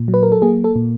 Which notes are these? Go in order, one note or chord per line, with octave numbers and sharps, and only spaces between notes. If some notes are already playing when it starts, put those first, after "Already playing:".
Already playing: A#2
F#3
B4
A#4
A4
A#3 G#4
A4
A#2